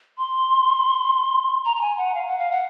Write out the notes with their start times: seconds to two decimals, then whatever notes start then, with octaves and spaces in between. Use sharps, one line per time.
0.18 C6
1.65 A#5
1.76 A#5
1.81 G#5
1.97 F#5
2.14 F5
2.27 F#5
2.38 F5
2.52 F#5